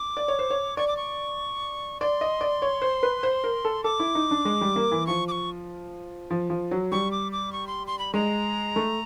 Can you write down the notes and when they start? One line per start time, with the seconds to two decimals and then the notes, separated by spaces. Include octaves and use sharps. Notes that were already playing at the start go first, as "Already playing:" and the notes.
Already playing: D6
0.17 D5
0.28 C#5
0.39 C5
0.50 C#5
0.77 D5 C#6
0.88 D6
0.97 C#6
2.01 D5 C6
2.21 D#5
2.41 D5
2.62 C#5
2.82 C5
3.03 B4
3.23 C5
3.44 A#4
3.65 A4
3.84 A4 D6
4.00 E4
4.15 D#4
4.31 D4
4.45 G#3
4.61 G3
4.76 A#3
4.91 E3
5.07 F3 C#6
5.28 D6
5.32 C#6
6.30 F3
6.50 F3
6.71 F#3
6.92 G3 C#6
7.11 D6
7.32 D6
7.53 C#6
7.67 C6
7.87 C6
7.99 B5
8.14 G#3 A#5
8.76 A3